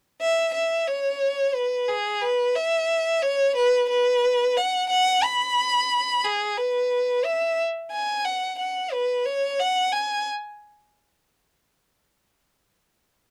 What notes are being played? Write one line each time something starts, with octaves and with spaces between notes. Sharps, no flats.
E5
E5
C#5
B4
G#4
B4
E5
C#5
B4
B4
F#5
F#5
B5
G#4
B4
E5
G#5
F#5
F#5
B4
C#5
F#5
G#5